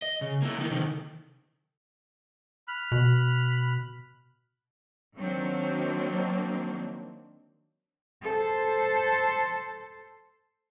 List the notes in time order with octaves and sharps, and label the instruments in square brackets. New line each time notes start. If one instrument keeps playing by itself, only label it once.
[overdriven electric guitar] D#5
C#3
A#3 E4
E3 D#4
C3 D#3
[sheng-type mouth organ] B5 F6 F#6
[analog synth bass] B2
[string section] D#3 F#3 A#3 C4 D4
[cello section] A4 C5